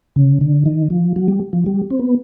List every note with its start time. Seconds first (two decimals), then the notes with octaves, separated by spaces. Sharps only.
0.16 C#3
0.41 D3
0.66 D#3
0.90 F3
1.16 F#3
1.28 G3
1.53 F3
1.66 G3
1.90 C4
1.99 B3